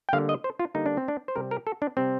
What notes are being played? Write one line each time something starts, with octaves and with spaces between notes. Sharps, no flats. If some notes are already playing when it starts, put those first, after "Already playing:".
G5
D3 G3 A#3 F5
D#5
C5
F4
D3 G3 A#3 D#4
D4
C4
D4
C5
C3 G3 C4 A#4
A#4
A4
D4
C3 G3 C4